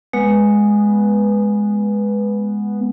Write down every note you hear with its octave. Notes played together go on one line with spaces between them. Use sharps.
G#3 B3